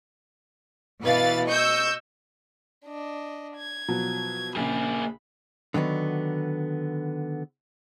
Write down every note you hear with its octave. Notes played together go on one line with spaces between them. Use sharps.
B2 E3 B4 F5 A6
D#5 C#6 E6 G6
D4 D#5
G#6
B2 F3 F#3
A#1 C#3 A#3 G#4 B5
D3 D#3 F#3 B3